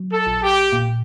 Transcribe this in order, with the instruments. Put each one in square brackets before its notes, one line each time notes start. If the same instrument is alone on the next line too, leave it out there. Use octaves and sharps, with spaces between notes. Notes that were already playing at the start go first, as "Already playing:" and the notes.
Already playing: [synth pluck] F#3
[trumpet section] A4
[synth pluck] A#1
[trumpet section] G4
[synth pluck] A#2